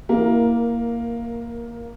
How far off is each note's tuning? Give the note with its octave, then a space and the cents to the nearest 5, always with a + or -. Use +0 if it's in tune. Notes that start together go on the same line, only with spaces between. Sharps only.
A#3 +0 E4 +0 A#4 +15